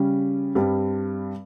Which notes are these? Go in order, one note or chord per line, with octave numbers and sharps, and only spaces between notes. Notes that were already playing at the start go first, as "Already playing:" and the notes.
Already playing: C#3 G3 C#4
G2 G3 C4